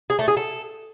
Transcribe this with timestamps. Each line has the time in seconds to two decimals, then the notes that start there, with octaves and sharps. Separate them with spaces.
0.10 G#4
0.19 A3
0.28 G#4
0.37 A4